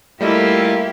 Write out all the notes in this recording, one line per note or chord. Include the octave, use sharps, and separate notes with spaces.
G3 A3 A#3 E4 F4 G4 D#5 E5